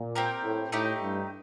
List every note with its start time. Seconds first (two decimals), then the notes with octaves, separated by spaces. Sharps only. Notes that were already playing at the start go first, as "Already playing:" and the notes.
Already playing: A#2
0.15 C4 G4 A#4
0.44 A2
0.72 A2 A3 D#4 G4
1.01 G2